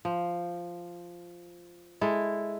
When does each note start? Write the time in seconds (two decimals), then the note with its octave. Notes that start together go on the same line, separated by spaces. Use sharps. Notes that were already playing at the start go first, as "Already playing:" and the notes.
0.05 F3
2.01 G#3 E4 A4